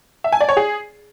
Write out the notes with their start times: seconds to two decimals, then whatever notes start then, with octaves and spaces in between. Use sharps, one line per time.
0.24 E5
0.32 G#5
0.41 D5
0.49 C#5
0.57 G#4